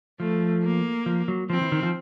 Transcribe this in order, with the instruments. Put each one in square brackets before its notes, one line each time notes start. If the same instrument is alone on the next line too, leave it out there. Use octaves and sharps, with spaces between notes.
[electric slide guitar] F3 [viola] A3
[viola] A#3
[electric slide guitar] F3
F#3
[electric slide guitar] F3 [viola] C4
[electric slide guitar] E3
D#3
F3